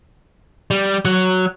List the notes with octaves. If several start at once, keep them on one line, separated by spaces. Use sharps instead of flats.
G3
F#3